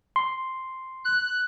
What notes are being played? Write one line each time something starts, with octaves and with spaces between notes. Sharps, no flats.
C6
F#6